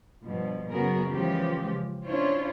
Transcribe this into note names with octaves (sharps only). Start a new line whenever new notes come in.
G2 B2 F3
F#2 C#3 B3 F#4 G#4 A#4
C#3 E3 F3 G#3 G4
C#4 D4 E4 F4 C5 C#5